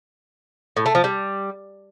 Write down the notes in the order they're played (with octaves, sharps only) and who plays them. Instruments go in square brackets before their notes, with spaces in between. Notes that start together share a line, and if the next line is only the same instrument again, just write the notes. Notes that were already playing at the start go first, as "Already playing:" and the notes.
[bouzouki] A2
A3
F3
G3